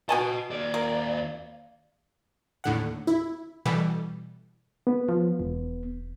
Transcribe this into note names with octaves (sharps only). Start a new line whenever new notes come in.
B2 F#4 D#5 G#5 A5
D#2 D5
A#3
D#2 A2 D3 F#5
E4
B2 E3 G3 A4
B3
F3
E1